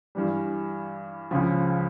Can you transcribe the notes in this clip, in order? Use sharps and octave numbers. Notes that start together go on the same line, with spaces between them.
G2 E3 G3
C#2 C#3 F3